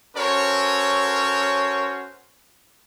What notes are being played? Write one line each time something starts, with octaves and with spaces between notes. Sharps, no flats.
C#4 F#4 A4 A#4 C5 C#5